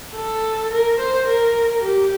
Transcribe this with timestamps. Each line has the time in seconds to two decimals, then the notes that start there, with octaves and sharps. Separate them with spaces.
0.15 A4
0.71 A#4
1.00 C5
1.28 A#4
1.84 G4